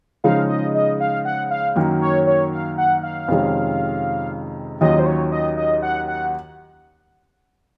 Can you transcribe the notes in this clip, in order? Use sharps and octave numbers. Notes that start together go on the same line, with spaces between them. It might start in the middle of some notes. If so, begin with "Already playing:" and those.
C#3 F3 G#3 D#4 F5
D#5
D#5
F5
F#5
F5
F#2 D#3 F#3 A#3
C#5
C#5
F5
F#5
F5
F2 C3 D#3 G#3 C#4
D#2 D#3 F#3 C#4 F4 D#5
C5
C#5
D#5
D#5
F#5
F#5